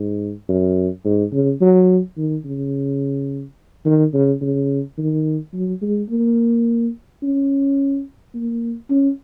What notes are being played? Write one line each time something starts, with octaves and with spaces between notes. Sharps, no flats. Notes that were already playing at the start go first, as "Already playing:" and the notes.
Already playing: G#2
F#2
G#2
C#3
F#3
D#3
C#3
D#3
C#3
C#3
D#3
F#3
G#3
A#3
C#4
A#3
C#4